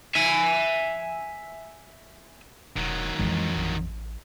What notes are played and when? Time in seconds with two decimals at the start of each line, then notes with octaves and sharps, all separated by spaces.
0.15 E5 G#5
2.76 E1 D#3 F#3
3.19 F2 E3 G#3
3.57 A1